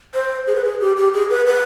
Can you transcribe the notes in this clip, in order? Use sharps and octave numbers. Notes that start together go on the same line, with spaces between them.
C5
G#4
B4
G#4
G4
G4
G#4
B4
B4